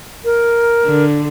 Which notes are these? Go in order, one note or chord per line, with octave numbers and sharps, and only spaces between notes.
A#4
D3